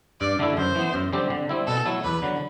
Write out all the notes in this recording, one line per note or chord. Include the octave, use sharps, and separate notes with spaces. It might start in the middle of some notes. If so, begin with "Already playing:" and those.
G2 D5
D3 A3 E4 A4
F#2 C5
E3 B3
F#2
D3 G3 C4 G4
D3
G3 C4 E4
B2 A4
F#3 A3 E4
E2 B4
D3 F#3